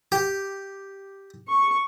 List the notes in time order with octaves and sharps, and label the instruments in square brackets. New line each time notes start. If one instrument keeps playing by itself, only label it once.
[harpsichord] G4
[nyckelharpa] C#6